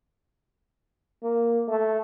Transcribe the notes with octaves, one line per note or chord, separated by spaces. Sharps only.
A#3
A3